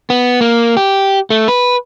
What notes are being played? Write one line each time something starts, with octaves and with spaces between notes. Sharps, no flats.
B3
A#3
G4
A3
B4